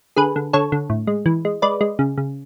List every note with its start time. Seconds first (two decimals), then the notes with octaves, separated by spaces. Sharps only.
0.16 D3 G#4 B4
0.36 D3
0.53 D3 A4 C#5
0.72 D3
0.90 A2
1.07 G#3
1.26 E3
1.45 G#3
1.62 G#3 B4 D5
1.81 G#3
1.99 C#3
2.18 C#3